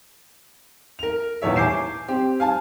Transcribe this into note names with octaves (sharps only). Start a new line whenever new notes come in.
A#4 F7
D#1 E2 A2 C#5 E5
G#5 D6 G6 C7 E7
C4 G4
F5 G#5 A5